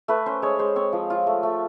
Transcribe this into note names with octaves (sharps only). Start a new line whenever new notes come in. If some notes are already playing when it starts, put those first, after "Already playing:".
A3 B4
C#4 C5
G#3 C#5
G#3 C5
C4 C#5
F3
F4
A3
A3